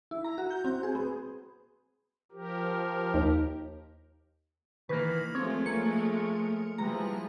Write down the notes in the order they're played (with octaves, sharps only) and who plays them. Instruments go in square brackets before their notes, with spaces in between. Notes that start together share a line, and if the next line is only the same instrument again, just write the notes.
[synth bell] E4
A#5
F#4
G6
C4
G#4
B3
[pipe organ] F3 G4 A#4
[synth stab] D#2
[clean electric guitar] D#3 E3 A#3 [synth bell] B4
[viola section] F3 G#3 A3 [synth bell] C4 [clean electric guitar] C#5
[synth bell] A#3 C#7
[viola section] E3 F3 [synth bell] G3 G#3 A#5